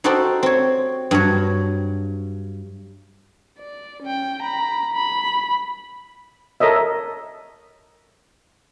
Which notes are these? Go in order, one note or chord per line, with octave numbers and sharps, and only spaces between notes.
D#4 F#4 G4 A4 C5 D5
C4 C#5
G2 F#3 C#5
D5
C#4 G5
A#5 B5
B5
A4 A#4 C#5 D#5 E5